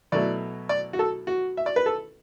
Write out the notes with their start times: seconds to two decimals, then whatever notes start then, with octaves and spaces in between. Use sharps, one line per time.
0.12 B2 F#3 A3 E4 D5
0.69 D5
0.93 F#4
0.99 A4
1.27 F#4
1.57 E5
1.66 D5
1.76 B4
1.86 A4